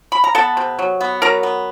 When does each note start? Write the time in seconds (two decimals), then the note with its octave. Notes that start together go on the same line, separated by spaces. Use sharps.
0.12 B5
0.24 A#5
0.35 B3 A4 A5
0.57 C3
0.79 F#3
1.00 B3
1.22 F#3 A#4 A#5
1.43 B3